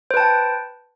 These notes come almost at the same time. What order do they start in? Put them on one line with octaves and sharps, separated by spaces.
C5 B4 A5 G5